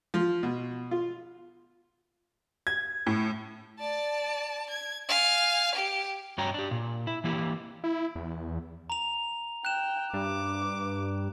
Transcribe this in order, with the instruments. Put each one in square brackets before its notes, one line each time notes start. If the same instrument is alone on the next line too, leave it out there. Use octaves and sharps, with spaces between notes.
[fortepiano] F3
B2
F4
[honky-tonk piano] G#6
A2
[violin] D5 A5
G#6
F5 G#5
G4
[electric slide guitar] G2 C#4 F#4 C#5 G5 A#5
D4 G4
A#2
E4
E3 A#3 E4 G4
[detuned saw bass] E4
E2
[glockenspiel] A#5 F7
[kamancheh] G5 [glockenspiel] F#6 E7
[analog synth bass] G2 [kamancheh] D6